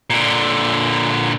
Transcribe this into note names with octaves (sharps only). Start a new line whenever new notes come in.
A#2 D3